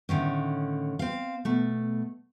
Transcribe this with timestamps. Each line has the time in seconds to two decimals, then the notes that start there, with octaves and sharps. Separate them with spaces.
0.09 A2 D3 D#3 C#4
0.99 C4 F5
1.45 B2 A3